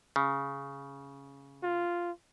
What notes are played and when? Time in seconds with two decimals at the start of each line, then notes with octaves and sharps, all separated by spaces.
0.16 C#3
1.63 F4